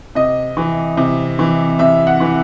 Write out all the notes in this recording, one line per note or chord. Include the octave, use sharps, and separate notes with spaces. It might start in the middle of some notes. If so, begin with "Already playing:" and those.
C3 D#5
E3
C3
E3
C3 E5
F#5
E3